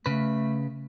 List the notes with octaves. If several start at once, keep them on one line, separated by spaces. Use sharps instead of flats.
C#3 A3 B4